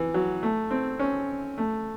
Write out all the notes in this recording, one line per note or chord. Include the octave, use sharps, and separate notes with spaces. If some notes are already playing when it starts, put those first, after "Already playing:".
Already playing: E3
F#3
A3
C4
C#4
A3